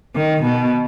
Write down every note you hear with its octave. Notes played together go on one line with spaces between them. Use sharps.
D#3
B2